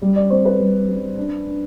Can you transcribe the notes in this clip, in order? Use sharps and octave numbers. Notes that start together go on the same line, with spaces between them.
G3
D5
C4 C5
B4
G3
G3
D4
D4